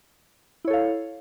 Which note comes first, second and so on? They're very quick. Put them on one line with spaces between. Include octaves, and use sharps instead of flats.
E4 C#5 A4 F5